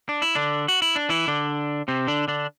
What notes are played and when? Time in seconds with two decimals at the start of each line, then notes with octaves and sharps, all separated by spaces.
0.09 D4
0.22 E4
0.35 D3 D4
0.68 F#4
0.82 E4
0.96 D4
1.09 E3 E4
1.27 D3 D4
1.88 C3 C4
2.07 D3 D4
2.28 D3 D4